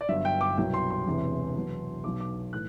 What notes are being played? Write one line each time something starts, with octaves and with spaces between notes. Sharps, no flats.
D5
G1 G2 F#3 E5
G5
D6
C2 B2 F#3 G5
C6
C6
E1 E2 C3 E3
E2 B2 F#3
B1 B2 F#3 D6
D6
A2 E3 F#6